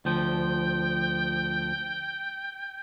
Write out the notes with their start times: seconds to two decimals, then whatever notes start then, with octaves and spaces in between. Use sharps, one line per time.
0.05 D2 F3 G5